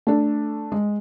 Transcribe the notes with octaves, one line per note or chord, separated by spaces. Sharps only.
A3 D4
G#3